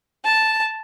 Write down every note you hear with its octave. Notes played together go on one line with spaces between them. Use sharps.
A5